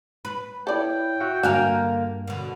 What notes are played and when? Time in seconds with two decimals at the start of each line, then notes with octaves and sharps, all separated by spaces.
0.25 B4
0.67 E4 A4 C#5 D5 G5
1.20 F#4 E5 F#5
1.43 G2 D3 A#3 F#4 A#4 G#5
2.27 B2 D3